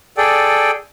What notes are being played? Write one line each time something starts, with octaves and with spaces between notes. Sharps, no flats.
G#4 A4 D5 G5